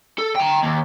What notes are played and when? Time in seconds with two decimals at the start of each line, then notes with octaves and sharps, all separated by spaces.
0.19 A4
0.36 G5 A#5
0.63 D#2